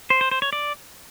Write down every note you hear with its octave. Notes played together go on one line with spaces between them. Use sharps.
C5
C5
C5
C#5
D5